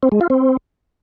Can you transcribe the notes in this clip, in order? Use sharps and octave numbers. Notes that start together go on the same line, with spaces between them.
C4
G#3
F4
C4